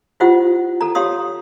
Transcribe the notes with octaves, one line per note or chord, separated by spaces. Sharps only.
E4 F4 G4 C5 F#5
A4 A#5
G4 C#5 F5 C6 D#6